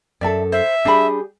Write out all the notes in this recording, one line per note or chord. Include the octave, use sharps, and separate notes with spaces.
F#2 A4 D5 E5 A5
C5 E5
G3 D4 G4 G#4 B5